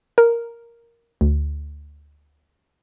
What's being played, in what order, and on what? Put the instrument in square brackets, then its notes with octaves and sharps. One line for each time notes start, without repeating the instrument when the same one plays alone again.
[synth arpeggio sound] A#4
D2